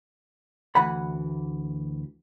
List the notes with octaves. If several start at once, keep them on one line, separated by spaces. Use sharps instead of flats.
D2 E3 F#5 B5